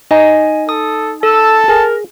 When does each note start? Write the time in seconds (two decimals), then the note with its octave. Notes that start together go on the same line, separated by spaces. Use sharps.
0.11 D#4 D#5 G#5
0.69 A4 D#6
1.23 A4 A5 E6
1.68 G#4 A#4